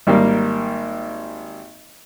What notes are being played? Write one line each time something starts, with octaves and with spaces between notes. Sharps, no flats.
G#1 G3 A#3